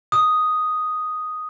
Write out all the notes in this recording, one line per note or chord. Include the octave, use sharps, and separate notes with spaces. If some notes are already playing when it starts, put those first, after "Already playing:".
D#6